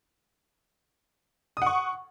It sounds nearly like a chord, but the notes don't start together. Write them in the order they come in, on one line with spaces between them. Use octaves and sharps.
D#6 F#5 C#6